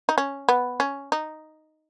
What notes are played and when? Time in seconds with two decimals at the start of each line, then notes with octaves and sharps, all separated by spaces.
0.09 D#4
0.18 C#4
0.49 B3
0.80 C#4
1.12 D#4